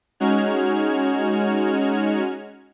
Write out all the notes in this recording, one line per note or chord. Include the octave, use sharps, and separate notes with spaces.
G#3 C#4 D#4 F#4 F6 G#6